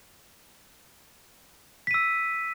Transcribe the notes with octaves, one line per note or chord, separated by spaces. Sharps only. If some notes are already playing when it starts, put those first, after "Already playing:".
E6 B6 D#7